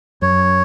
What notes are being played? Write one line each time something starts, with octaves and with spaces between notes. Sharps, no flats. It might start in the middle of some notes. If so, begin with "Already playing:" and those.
F#2 C#5